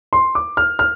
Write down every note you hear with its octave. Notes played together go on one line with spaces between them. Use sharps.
C6
D6
F6
F6